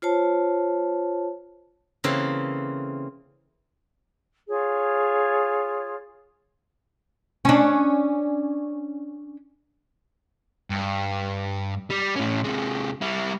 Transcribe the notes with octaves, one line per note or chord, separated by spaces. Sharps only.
F4 C5 C#5 A5
C#3 E3 A#3 C4 A4
F4 G#4 C#5
C#4 D4
G2
G3
A2 C#4
C3 G#3
G3 E4